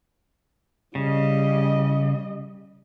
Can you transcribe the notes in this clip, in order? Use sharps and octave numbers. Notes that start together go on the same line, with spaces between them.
C#3 G3 D#5